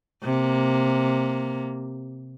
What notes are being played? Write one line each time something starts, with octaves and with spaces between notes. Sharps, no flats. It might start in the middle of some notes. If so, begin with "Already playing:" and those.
C3 A#3